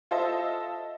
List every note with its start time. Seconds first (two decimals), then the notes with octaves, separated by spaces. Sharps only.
0.11 F4 A4 C5 D#5 E5